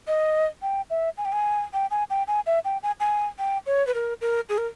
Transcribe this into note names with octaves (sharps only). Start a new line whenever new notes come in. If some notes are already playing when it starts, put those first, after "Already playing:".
D#5
G5
E5
G#5
G5
G#5
G5
G#5
G5
G#5
E5
G5
G#5
G#5
G5
C#5
B4
A#4
A#4
G#4
A#4